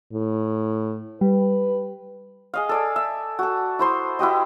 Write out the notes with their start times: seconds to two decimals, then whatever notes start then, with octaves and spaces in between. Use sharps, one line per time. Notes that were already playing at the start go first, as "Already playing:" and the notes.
0.13 A2
1.21 G3 B4
2.54 G#4 D#5 F5
2.69 A4 D5 G#5
2.96 E5
3.39 F#4 A4
3.79 E4 C5 C6 D#6
4.19 E4 F#4 G4 D#5